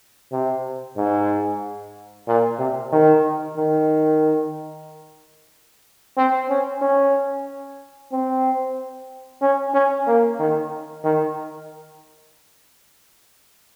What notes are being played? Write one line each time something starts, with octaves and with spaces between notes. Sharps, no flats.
C3
G#2
A#2
C3
D#3
D#3
C4
C#4
C#4
C4
C#4
C#4
A#3
D#3
D#3